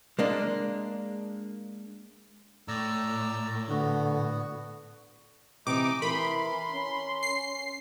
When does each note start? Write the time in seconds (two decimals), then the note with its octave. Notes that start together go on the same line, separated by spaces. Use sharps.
0.19 G#3 A#3 D4
2.68 A2 D5 A#5 E6
3.69 D3 B3 F#4
5.67 C3 E3 C4 D#4 D6
6.02 E3 A#4 B5 C6
6.72 C#4
7.23 C7